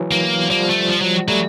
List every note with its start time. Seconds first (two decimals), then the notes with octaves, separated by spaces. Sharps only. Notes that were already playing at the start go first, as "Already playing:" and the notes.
Already playing: E3 F#3
0.12 A#3
0.50 F3 G3 A#3
0.70 A3
0.89 F3
1.02 F#3
1.28 F#3 G3 A3